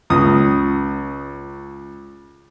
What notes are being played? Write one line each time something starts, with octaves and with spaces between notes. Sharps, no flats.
C#2 D#6